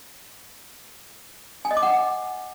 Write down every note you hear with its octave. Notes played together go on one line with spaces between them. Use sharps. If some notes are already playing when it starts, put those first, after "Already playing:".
G#5
D#5
D6
F#5